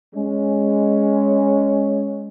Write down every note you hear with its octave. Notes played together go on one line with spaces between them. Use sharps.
G#3 C#4